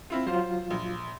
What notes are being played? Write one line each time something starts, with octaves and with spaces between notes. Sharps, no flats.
C4 E4 F4
F#3 F4 C5
A#1